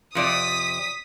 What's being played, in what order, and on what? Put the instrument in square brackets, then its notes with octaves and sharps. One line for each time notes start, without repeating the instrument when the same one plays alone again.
[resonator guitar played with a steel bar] F2 C3 D5 [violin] D#6 B6